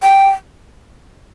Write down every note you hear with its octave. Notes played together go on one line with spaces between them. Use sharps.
G5